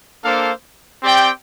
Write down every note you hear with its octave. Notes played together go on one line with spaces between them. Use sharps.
A#3 D4 A4 C5 F5
C4 G4 D5 G5